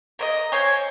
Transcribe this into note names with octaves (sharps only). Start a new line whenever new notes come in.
A#4 C5 D#5
C5 C#5 G#5